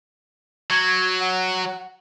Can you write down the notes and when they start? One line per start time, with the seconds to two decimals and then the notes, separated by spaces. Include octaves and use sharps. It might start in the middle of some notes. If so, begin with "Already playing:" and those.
0.71 F#3 G#6
1.20 F#5